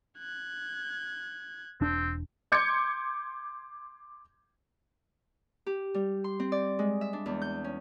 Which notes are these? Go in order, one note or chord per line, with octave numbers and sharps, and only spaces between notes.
F#6 G#6
E1 C4 D4
C6 D6 G6 G#6 C#7
G4
G3
C6
C4
D5
G#3
E5
D4
E2
G6
C#4